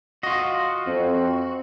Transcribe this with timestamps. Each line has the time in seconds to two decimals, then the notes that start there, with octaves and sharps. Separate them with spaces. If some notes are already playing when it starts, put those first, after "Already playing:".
0.23 F4 F#4 D#5
0.87 F2 C4